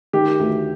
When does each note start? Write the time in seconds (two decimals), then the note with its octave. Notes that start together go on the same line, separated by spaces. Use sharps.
0.13 D#3 G4
0.39 D2